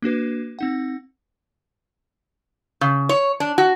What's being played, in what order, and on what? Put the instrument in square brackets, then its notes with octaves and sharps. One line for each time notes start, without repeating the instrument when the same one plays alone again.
[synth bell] A#3 D4 F#4 B4
C4 D#4 F#5
[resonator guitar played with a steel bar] C#3
C#5
D4
F#4